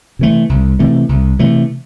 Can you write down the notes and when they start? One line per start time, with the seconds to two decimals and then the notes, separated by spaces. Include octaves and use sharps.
0.19 C3 E3 A3
0.49 C2
0.79 C3 E3 A3
1.09 C2
1.39 C3 E3 A3